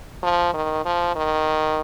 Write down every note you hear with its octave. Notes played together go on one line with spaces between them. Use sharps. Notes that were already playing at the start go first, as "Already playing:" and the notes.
F3
D#3
F3
D#3